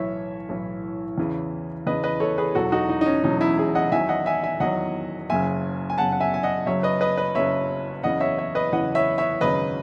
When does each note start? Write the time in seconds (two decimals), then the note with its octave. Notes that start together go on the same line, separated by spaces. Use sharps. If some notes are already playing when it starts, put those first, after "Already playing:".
Already playing: B1 A2 E3 C#5 E5
0.49 B1 A2 E3
1.18 E2 C#3 E3
1.87 E2 C#3 E3 B4 D#5
2.03 B4 D#5
2.20 A4 C#5
2.38 G#4 B4
2.55 E1 E2 B2 F#3 F#4 A4
2.72 D#4 F#4
2.89 D#4
3.01 D#4
3.06 C#4
3.23 E1 E2 B2 F#3 D#4
3.41 C#4 E4
3.58 E4 G#4
3.75 D#5 F#5
3.92 E2 D#3 F#3 E5 G#5
4.09 D#5 F#5
4.26 E5 G#5
4.44 E5 G#5
4.60 E2 D#3 F#3 D#5 F#5
5.30 F#1 F#2 C#3 E5 G#5
5.90 G#5
5.98 F#1 F#2 C#3 F#5 A5
6.12 F#5
6.20 E5 G#5
6.34 G#5
6.43 D#5 F#5
6.66 F#1 F#2 C#3 F#3 C#5 E5
6.83 B4 D#5
7.01 B4 D#5
7.18 B4 D#5
7.35 F#1 F#2 C#3 F#3 C#5 E5
8.03 F#1 E2 C#3 E3 D#5 F#5
8.20 C#5 E5
8.38 C#5 E5
8.55 B4 D#5
8.72 F#1 E2 C#3 E3 D#5 F#5
8.95 C#5 E5
9.18 C#5 E5
9.41 G#1 F#2 C#3 F#3 B4 D#5